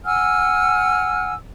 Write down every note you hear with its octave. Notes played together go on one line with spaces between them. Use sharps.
F#5 G#5 E6 F6